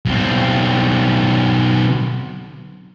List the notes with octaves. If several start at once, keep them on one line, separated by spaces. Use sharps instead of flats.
B1 C4